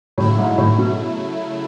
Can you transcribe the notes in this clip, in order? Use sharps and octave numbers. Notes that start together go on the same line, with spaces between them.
A2 C#3 F#3 A3 E4
G#2
A2
B2